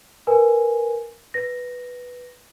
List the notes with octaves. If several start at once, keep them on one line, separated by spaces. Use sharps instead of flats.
A#4 B4 G#5
B4 A#6